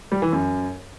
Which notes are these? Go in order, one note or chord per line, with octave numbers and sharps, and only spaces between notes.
G3
E3
F#2